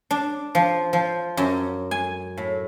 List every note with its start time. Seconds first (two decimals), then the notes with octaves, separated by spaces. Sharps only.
0.11 D4
0.55 F3
0.93 F3
1.37 F#2
1.91 G#5
2.37 A2